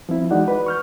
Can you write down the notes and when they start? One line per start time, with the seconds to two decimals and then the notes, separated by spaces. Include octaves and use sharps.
0.09 F3 C4 E4
0.31 E3 G#3 D#4 F#4 D5 F#5
0.48 B4
0.66 C#6 F6 G6